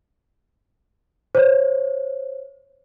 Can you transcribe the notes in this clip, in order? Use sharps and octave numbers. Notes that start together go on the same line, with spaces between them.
C5 C#5